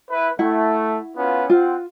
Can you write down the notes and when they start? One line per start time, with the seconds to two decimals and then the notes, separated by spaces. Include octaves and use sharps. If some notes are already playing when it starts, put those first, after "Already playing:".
0.10 E4 B4
0.39 A3 E4 F#5
1.16 B3 C#4 F4
1.50 C4 F4 F#5